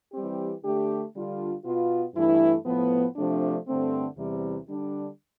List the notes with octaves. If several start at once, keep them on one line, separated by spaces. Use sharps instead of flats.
E3 G3 C4 G4
D3 A3 D4 G4
D3 G3 D4 F4
B2 B3 F4
G2 E3 A3 E4
A2 F3 B3
C3 F3 A3 D4
G2 D3 A3 C4
E2 C3 E3 G3 C4
D3 G3 D4